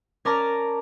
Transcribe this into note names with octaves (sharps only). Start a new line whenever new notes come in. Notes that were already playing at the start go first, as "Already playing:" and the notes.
C#4 A#4 D5 A5 A#5